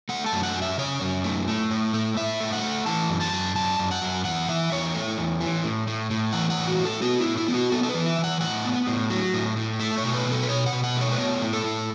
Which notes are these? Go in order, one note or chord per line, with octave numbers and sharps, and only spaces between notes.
A3 F#5
A5
F#2
F#5
F#2
E5
C#3 C#5
F#2
A3
A3
A2
A3
A2 E5
A3
F#5
A3
E3 A5
F#2
A5
F#2
F#2 A5
F#2
F#5
F#2
E2 F#5
E3 E5
E2 C#5
A3
E2
E3
A2
A2
A2
E3 F#5
F#5
A2
F#4
A2
A4
B3 F#4
E4
A2
E4
B3
F#4
B3 A4
A4
B4
E3
E5
E3
F#5
A2 F#5
B3
A2
F#3
A2
A2
A3 E5
C#5
B2
B4
B2
A4
B4
B2 C#5
F#5
B2
F#5
A3
C#5
B4
B3 C#5
A2
A4
A2